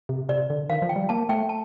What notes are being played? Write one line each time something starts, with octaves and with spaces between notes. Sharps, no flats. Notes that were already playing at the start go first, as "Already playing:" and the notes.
C3
C3 D5
D3
D#3 F5
F3
G5
G3
A#3 A5
A3 G5
A5